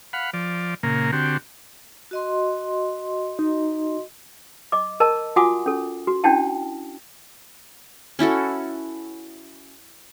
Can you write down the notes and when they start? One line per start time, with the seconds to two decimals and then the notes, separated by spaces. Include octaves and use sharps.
0.13 F5 F#5 B5
0.34 F3 D5
0.83 A#2 C#3 A#3
1.12 D3 C4 F#4 G4
2.11 F#4 D#5 C6
3.39 D#4
4.72 D#5 D6
5.00 A#4 D#5 A5 A#5
5.36 F4 F#4 F#5 G#5 D6 D#6
5.66 C#4 A4
6.07 F#4
6.24 C#4 D4 E4 F#5 G5 A5
8.19 C#4 E4 F#4 A4